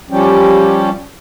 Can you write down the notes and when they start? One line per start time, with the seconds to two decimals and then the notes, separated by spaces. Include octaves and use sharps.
0.10 F3 G3 C#4 G4